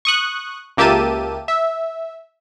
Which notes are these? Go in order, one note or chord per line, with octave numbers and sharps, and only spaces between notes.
C#6 D#6 F#6
C#2 A#3 G4 E5 A5 D#7
E5